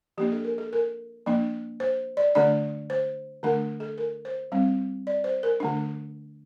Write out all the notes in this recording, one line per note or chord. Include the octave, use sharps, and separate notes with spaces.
F3 A#3 D4 G4
A4
A#4
A4
A#4
F3 A#3 D4
C5
D5
D3 A3 D4 D5
C5
D3 A3 D4 A#4
A4
A#4
C5
G3 C4
D5
C5
A#4
D3 A3 D4